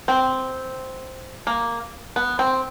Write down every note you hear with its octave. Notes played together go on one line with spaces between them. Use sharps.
C4
A#3
B3
C4